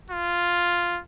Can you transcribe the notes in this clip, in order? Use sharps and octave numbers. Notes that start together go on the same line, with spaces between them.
F4